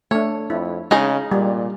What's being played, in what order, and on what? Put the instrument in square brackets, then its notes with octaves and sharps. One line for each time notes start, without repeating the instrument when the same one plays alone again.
[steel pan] A3 D4 [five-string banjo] C#5
[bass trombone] F2 [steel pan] E4
[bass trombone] C#3 [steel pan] G#3 [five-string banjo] D#4 G#4 D#5
[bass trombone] A#2 [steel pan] G3